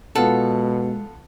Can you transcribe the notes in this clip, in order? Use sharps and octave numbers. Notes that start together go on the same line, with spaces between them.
B2 G#3 B3 F4 A4 F#5